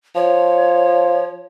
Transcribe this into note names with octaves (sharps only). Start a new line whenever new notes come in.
F3 C#5